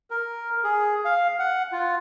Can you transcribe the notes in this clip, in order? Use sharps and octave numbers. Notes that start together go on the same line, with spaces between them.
A#4
G#4
F5
F#5
F4